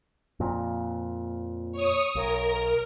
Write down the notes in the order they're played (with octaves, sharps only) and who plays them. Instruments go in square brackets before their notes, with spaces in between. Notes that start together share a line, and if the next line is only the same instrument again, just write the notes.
[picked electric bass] F2 A#2
[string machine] C#5 D#6
[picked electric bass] B1 [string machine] A#4